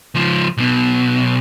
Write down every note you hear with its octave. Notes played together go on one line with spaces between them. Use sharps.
C#2 F3
B1 B2